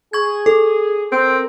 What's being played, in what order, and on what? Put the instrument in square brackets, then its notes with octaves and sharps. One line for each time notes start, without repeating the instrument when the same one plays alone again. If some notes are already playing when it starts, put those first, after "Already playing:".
[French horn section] G#4 [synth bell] C#6 G#6
[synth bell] A4
[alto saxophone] C4 [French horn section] A#4